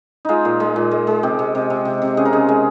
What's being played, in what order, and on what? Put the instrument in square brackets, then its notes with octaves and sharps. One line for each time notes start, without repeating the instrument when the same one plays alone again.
[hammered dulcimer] G#3 D#4 F4
A#2
G#3
A#2
G#3
G#3
C3 G4
C3
C3
C3
C3
C3
C#3 G#4
A#4
C#3 G#4
G#3